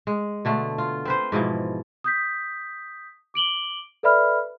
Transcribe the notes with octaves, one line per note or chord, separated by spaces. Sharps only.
G#3
B2 D3 A3
F4
C4 B4 C5
G#2 B2 E3 F3
D#6 G6 B6
D6 D7 F#7 G7
A4 B4 D5 E5 B5 F6